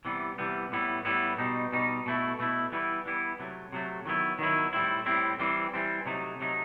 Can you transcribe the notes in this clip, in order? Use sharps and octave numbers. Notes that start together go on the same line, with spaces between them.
C3 E3 G3 B3
C3 E3 G3 B3
A2 G3 B3 E4
A2 G3 B3 E4
B2 G3 D#4
B2 G3 D#4
B2 A3 E4
B2 A3 E4
E3 G3 B3 E4
E3 G3 B3 E4
C3 F#3 A3
C3 F#3 A3
D#3 F#3 B3 E4
D#3 F#3 B3 E4
A2 G3 C4 E4
A2 G3 C4 E4
E3 G3 C4
E3 G3 C4
C3 F#3 A3 D#4
C3 F#3 A3 D#4